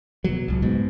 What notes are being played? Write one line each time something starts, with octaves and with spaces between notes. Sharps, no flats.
B2 F#3
D1 C#2
G#2 B2